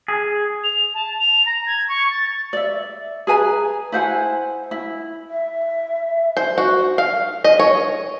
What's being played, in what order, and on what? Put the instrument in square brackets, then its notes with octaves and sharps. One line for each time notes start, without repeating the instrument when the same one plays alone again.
[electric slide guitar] G#4
[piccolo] F7
A5
F7
A#5
G#6
C#6
A6
[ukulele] D5 E5
G#4 B4 G#5 A#5
E4 C5 F#5 G#5
E4
[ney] E5
[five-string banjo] C5
F#4
F5
D#5
C#5